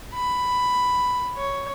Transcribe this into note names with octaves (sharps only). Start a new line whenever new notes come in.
B5
C#5